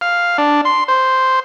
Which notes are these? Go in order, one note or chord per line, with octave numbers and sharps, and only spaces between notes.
F5
D4
C6
C5